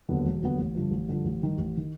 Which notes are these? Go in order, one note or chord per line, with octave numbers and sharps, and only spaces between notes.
D#2 D3 F#3 B3
E1
D#2 D3 F#3 B3
A1
G2 D3 F3
A1
G2 D3 F3
A1
G2 D#3
A1
D#3